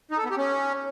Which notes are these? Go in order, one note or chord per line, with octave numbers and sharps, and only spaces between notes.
D#4
A4
B3
G4
C#4